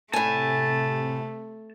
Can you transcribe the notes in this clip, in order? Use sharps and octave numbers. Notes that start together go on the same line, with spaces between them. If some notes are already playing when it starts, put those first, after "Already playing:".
A2 C3 A3 G#5 A5